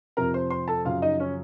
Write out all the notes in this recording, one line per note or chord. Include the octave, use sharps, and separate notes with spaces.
F2 C3 F3 A#4 A#5
C5 C6
C5 C6
A4 A5
F#2 C#3 F3 F4 F5
D#4 D#5
C#4 C#5